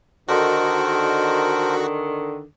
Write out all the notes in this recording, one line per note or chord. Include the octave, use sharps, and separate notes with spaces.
D3 D#3 F#4 A4 A#4 C5